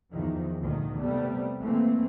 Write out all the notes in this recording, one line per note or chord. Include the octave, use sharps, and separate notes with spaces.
E2 D#3 F3
D2 A#2 D#3
C3 G3 A3 B3
E3 A3 A#3 C4